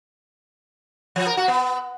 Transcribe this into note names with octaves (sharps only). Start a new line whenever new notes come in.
F3
A#4
F#4
B3